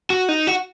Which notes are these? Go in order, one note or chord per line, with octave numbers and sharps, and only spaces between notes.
F#4
D#4
F#4